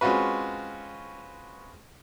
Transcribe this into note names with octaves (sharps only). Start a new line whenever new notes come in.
G#3 C4 C#4 F4 F#4 B4